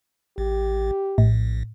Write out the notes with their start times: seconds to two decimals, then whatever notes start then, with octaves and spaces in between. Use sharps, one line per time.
0.38 A1 G4
1.18 A#1 A2